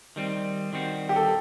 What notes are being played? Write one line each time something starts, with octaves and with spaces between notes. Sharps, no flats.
D#3 G3 C4
D#3 G3 C4 F#4
G4
A4